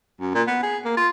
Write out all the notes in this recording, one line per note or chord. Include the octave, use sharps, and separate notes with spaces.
F#2
A#2
B3
G#4
A#3
F4